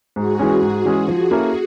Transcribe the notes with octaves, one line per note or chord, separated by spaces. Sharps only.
G#2 F#4 G#4
E3 G#3 C#4
G#2
E3 G#3 C#4
F3 F#4 G#4
A#3 C#4 E4 A4